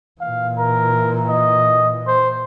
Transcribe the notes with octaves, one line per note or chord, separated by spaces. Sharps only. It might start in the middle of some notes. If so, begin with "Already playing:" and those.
A#2 E3 F5
A#4
D#5
C5